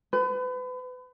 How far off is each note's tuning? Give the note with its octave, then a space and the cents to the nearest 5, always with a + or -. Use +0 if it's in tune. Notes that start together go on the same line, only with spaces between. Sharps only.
B4 +35